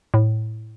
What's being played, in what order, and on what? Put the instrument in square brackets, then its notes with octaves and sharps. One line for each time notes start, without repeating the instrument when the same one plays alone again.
[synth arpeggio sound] A2